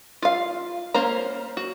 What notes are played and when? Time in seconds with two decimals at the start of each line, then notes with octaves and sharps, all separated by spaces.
0.22 F4 F5
0.94 A#3 C#4 C5 A#5
1.57 F#4